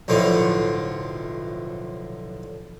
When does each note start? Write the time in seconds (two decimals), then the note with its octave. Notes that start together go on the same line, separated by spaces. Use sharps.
0.08 B1 A2 D3 F3